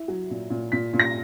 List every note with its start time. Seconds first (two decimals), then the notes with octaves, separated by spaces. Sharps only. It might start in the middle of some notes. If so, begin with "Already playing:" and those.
Already playing: E4
0.08 F#3
0.30 A#2
0.50 A#2
0.72 A#2 B6
0.93 A#2
1.00 A#6